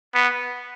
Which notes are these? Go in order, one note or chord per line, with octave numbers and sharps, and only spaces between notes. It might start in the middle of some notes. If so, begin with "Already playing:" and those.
B3